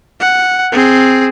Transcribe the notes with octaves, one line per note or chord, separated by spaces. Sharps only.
F#5
C4 G#4